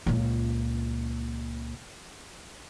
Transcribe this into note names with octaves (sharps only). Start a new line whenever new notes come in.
C#2 A#2